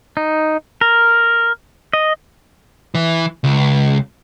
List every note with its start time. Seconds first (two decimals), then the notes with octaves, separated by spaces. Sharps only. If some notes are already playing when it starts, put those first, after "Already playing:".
0.17 D#4
0.81 A#4
1.93 D#5
2.95 E3
3.44 C#2